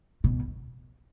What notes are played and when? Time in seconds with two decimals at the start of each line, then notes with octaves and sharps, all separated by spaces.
0.24 B2